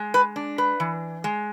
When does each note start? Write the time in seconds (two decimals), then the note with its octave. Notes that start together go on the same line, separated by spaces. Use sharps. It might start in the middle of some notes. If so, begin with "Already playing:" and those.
Already playing: G#3
0.14 B4
0.36 D4
0.58 B4
0.80 E3
1.24 G#3